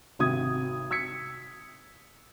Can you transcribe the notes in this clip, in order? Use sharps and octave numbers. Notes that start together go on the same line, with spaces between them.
G#1 C3 F#4 D#6 G#6
E6 G#6 B6 C#7